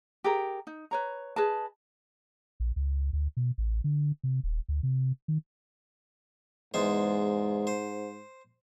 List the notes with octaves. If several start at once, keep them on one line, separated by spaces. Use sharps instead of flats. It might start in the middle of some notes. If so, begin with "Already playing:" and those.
G4 G#4 A#4 A#5
D#4
B4 C#5 A#5
G#4 B4 D#5 A5
A#1
C#2
D2
B2
A1
D3
C3
D#1
D2
C3
D#3
E2 G#2 G#3 C5
C5